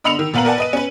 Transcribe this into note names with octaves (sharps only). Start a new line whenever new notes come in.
D3 D#5 B5 E6 C#7 F7
D#3
A#2 B3 B4 F5 A#5 F#7
A#4 B4 D5 F#5 G#5 A5
B4 D#5 D#7
C#4 B4